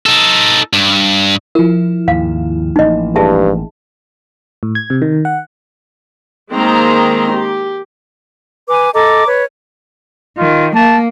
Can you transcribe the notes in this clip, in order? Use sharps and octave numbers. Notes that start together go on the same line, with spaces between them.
D#4 A4
G2
F3 E4 A#4
D#2 G#2 F5
A1 A#3 D#4 D#5
G2 G#4 E5 A5
A2
G#6
C3
D#3
F#5
D#3 G#3 A#3 C4 A#5 C6
G4
B4 G#5 D6
A4 D#5 A#5 D6
B4 C#5
D#3 F4
A#3 A5